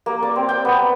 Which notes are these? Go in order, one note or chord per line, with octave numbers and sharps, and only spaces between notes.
A#3
D5
C4
G5
B3